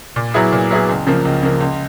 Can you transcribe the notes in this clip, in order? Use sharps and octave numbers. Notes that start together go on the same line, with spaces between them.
A#2
F#3 B3 E4 G#4
A#2
F#3 B3 E4 G#4
C#2
C#3 F3 A#3
C#2
C#3 F3 A#3
C#2